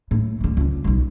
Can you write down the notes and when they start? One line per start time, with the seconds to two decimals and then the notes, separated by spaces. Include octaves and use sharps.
0.11 A2
0.41 D2 D3
0.57 C#2 D3
0.84 B1 G3